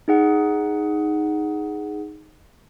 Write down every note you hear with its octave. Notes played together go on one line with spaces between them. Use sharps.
D#4 G#4 F#5